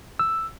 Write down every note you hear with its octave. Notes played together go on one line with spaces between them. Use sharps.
E6